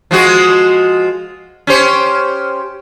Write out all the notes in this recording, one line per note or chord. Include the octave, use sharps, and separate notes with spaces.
F3 G#3 F#4
C#4 G4 C5